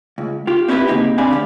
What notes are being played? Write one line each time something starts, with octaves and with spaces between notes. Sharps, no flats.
C#2
F4 G4
C4 C#4 E4 F4 G4 B4
C#3 A#3 C4 D#4 G4
C4 D4 D5 F5 G#5 B5
D2 C#3 G4